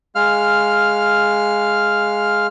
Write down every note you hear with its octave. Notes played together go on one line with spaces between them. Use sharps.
G#3 F5 F6